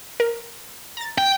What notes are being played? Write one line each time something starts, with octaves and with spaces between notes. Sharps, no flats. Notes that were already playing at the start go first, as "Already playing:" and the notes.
A#4
A#5 A6
G5